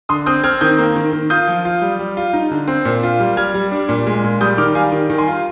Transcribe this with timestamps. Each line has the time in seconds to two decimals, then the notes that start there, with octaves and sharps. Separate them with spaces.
0.09 D3 C6 D#6
0.26 C4 D#6 G6
0.44 C4 F6 G#6
0.61 D#3 D#6 G6
0.78 A#3
0.96 D#3
1.13 D#3
1.30 F4 D#6 G6
1.48 F3
1.65 F4
1.82 G3
1.99 G3
2.17 F4
2.33 D#4
2.51 D3
2.68 C4
2.85 A#2
3.03 F4
3.20 G3
3.37 G3 F6 G#6
3.54 G3
3.72 D4
3.89 A#2
4.07 G#3
4.24 A#2
4.41 G3 D#6 G6
4.58 D#3 D6 F6
4.75 G3 F5 G#5
4.92 D#3
5.10 D#3
5.18 G#5 C6
5.28 F4